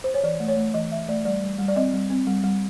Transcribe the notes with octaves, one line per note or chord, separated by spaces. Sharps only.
C5
C#5
E3 D5
A3
C#5
A3
E3 D#5
E3 E5
A3 D5
G3 D5
G3
G3
D5
C4 D#5
G3
C4
G3
G3